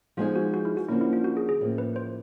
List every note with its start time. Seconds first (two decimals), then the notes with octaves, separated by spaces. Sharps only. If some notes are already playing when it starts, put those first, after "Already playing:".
0.17 F3 G#3 B3 D#4 F4 G#4
0.36 F#4
0.54 F#4
0.65 E4
0.77 F#4
0.89 D3 F3 A#3 C#4 E4
1.01 E4
1.13 F4
1.24 F#4
1.37 G#4
1.49 G#4
1.61 A2 F3 A#3 C#4
1.78 B4
1.96 C5